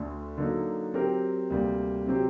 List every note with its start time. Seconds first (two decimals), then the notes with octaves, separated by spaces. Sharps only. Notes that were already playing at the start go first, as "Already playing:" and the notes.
Already playing: D2 D3 A3
0.38 D3 F#3 A#3 D#4
0.94 F#3 C4 G4 A#4
1.50 D2 C3 G3 A#3
2.06 C3 F#3 C4 G4